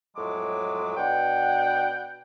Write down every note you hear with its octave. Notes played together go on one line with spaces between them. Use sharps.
F2 A2 F#3 G#3 D6
B2 D4 F#5 G5